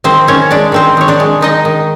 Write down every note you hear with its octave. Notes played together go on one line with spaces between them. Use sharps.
D#3 C4 C5
D#3 C#4 C#5
G#3 D4 D5
D#3 C4 C5
D#3 C#5
D4 D5
G#3
D#3 D#4 D#5
D#3